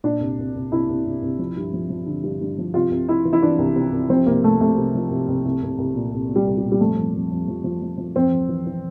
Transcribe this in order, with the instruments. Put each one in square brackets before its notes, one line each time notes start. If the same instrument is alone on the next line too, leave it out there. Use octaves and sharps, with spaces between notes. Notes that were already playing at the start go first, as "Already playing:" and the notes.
[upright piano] A#2 D4
C2
C2
C2
C2 E4
C2
C2
C2
F3
G2
F3
F3
D3
G2
G2
F3
C3 F4
C2
C3 E4
E3
E4
E3 D4
C2
C3
C2
F3 C4
C2 A#3
C2 A3
C2 A3
C3
F3
C2
C2
C2
C2
C2
A#2
C2
A#2
G3
C2
G3
A#2
G3
F2 A3
F2
F2
F2
F3
F3
F3
F3
F2 C4
F2
E3
E3